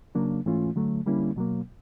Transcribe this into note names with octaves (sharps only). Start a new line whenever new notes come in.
C#3 F#3 A#3 D4
G#2 E3 A3 C#4 F4
D3 F#3 A3
D3 G3 A#3 C#4 E4
B2 F#3 A#3